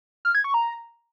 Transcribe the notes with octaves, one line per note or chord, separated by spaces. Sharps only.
F6
G#6
C#6
A#5